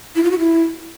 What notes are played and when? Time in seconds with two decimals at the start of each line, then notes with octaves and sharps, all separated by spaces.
0.16 E4
0.23 F4
0.31 F#4
0.39 E4